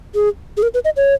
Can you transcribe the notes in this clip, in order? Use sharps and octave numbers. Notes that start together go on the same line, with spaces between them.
G#4
G#4
A#4
B4
D#5
C#5